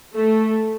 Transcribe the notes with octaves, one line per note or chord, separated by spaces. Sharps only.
A3